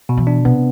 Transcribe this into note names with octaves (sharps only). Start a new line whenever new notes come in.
B2
E3
D4
C3 B3